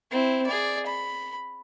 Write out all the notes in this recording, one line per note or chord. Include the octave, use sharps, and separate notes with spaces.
C4 E4
G#4 D5
B5